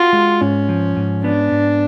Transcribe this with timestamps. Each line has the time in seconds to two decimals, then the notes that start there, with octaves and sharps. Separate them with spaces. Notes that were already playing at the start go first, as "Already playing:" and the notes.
Already playing: F4 F#4
0.13 G#3
0.41 G#2 C#4
0.69 F3
0.97 G#2
1.24 B3 D4
1.52 G#2